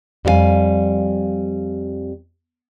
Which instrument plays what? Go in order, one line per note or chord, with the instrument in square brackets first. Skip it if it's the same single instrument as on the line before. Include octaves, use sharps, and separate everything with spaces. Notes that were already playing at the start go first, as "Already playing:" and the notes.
[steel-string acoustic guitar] F2 G3 G4 F5 G#5